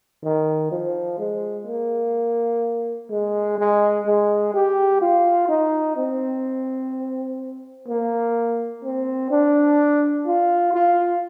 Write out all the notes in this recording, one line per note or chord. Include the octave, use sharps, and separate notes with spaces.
D#3
F3
G#3
A#3
G#3
G#3
G#3
G4
F4
D#4
C4
A#3
C4
D4
F4
F4